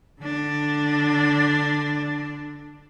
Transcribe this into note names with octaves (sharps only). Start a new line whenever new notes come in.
D3 D4